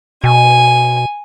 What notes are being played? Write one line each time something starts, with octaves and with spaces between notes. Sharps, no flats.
B2 G#5